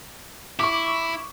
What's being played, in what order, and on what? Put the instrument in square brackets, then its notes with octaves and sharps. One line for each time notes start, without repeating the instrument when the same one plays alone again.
[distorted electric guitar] E4 [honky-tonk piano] C#6 D6